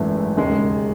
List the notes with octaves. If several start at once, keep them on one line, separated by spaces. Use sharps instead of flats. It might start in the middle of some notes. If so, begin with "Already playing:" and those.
Already playing: G#1 F#2 E3 A3
E1 D#2 C#3 G#3